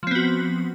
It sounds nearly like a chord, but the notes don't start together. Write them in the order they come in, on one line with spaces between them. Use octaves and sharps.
F3 C4 B3 F#4